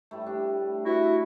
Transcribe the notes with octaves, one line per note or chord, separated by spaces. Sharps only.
A2 G3 A3
D4
E4 F#4